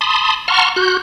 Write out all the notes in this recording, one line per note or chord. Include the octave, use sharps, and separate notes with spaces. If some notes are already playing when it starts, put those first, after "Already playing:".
A5 B5 C6 D#6
F#5 A5 A#5 C6 C#6 F6
F#4 F#6 G6